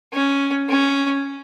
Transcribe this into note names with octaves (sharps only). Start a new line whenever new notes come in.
C#4
C#4